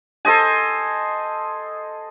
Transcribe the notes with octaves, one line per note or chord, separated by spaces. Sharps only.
A4 C5 D#5 G#5